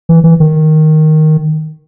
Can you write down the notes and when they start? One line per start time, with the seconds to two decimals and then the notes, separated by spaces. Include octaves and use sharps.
0.09 E3
0.24 E3
0.40 D#3